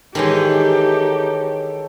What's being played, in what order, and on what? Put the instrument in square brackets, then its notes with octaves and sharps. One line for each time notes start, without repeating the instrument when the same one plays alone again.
[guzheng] D#3 E3 G#3 [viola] D#4 G4 [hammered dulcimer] A4 C#5